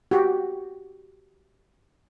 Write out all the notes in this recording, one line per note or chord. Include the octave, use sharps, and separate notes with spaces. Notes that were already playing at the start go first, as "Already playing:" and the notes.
F#4 G4